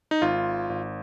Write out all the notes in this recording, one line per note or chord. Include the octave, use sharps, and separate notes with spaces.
D#4
G#1 F4
G#1